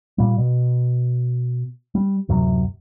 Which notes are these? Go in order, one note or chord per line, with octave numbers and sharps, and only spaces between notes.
A#2 G3
B2
G3
D1 F#2 C3 F#3